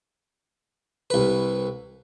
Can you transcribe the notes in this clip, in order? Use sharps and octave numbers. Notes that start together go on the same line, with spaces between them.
C2 B4